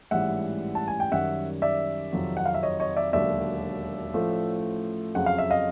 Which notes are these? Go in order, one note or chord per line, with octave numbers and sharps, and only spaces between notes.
A1 G#2 E3 G3 E5 F#5
A5
G#5
G5
F#2 D#3 G3 E5 F#5
D5 E5
F2 C3 D#3 F#3
F#5
F5
E5
C#5 D#5
C#5 D#5
D5 E5
E1 D#2 D3 F#3 D5 E5
A1 A2 F3 A3
F2 C#3 F#3 F#5
F5
E5
D#5 F5